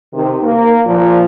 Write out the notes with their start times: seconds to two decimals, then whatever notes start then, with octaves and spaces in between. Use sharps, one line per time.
0.13 C3 D#3
0.43 A#3
0.86 A#2 F3